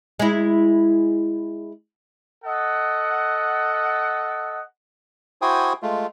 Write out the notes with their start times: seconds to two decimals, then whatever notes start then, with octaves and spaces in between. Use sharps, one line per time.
0.19 G#3 E4
2.45 A4 D#5 F#5
5.42 E4 F#4 C5 G5 G#5 D#6
5.82 G#3 A3 F4